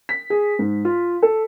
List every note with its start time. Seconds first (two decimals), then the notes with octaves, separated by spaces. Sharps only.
0.09 B6
0.30 G#4
0.59 G#2
0.85 F4
1.22 A4